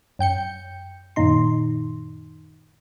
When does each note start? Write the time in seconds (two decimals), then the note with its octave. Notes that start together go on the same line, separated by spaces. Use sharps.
0.19 F#2 G5 G6 C#7
1.16 F#2 A#2 D#3 D#4 C6